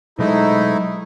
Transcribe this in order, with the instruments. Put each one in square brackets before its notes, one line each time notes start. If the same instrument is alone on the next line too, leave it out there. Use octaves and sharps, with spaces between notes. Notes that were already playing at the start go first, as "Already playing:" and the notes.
[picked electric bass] B2 F#3 G#3 [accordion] A3 D#4 E4